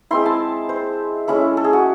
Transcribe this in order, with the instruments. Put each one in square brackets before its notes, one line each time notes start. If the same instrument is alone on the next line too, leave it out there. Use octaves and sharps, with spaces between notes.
[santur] G#3 C4 E4 C6
A5
C5
G#3 C#4 E4 A4
A4
G#4
F#4